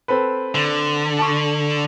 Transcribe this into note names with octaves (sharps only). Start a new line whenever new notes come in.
C4 A4 B4
D3
A5 C#6